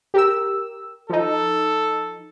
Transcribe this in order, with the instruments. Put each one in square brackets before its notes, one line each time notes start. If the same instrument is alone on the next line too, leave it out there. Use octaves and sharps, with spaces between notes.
[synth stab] G4 A#4 E6
[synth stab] F3 D#4 [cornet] A4